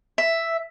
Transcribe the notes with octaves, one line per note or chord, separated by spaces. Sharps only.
E5